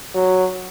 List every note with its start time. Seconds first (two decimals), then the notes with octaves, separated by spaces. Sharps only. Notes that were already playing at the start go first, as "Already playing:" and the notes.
0.15 F#3